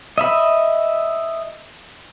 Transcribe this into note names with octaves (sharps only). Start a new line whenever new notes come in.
D#5 E5 B5